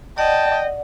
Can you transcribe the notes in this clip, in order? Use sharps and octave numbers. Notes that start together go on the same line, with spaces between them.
D5 D#5 F#5 G5 A5